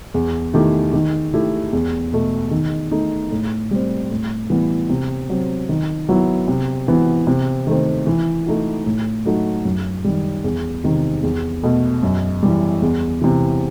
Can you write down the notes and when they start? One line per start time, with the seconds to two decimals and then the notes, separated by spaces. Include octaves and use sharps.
0.14 E2
0.54 D#3 A3 E4 G4
0.93 D#3
1.33 A3 E4 G4
1.73 E2
2.13 B2 A3
2.51 D#3
2.91 A3 D#4
3.31 A2
3.71 G3 C4
4.11 A2
4.50 E3 G3 B3
4.90 C3
5.29 F#3 C4
5.69 D#3
6.09 F#3 B3 E4
6.48 C3
6.87 E3 B3 F#4
7.27 C3
7.67 D#3 A3 C4
8.07 E3
8.46 A3 D#4 F#4
8.86 A2
9.25 F#3 A3 D#4 F#4
9.65 F#2
10.04 D#3 G3
10.44 E2
10.84 C3 D#3
11.23 E2
11.63 B2 A3
12.03 F#2
12.43 E3 G3
12.82 E2
13.22 C3 E3